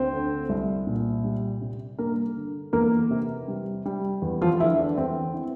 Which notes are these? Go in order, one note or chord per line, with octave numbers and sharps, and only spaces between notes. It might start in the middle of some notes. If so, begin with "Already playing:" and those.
Already playing: D2 C4 C5
D3
C2
A#2
G3
C3
G2 A#3 A#4
D3
E2 A#3 A#4
C3
G3
G3
E2
F3 F4
D3 E3 E4
D4
E2 C4
E3